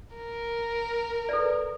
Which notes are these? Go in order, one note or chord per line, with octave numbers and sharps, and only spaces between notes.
A#4
A4 B4 D5